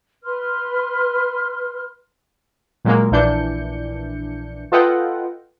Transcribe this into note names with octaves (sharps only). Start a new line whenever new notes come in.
B4 C6 F6
A#2 F#3 G#3 A#3
A#1 A#2 E3 D4 G6 C#7
F4 A4 B4 D#5 F#5 G5